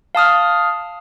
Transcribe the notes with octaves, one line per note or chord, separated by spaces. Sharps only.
F5 A5 D#6 F6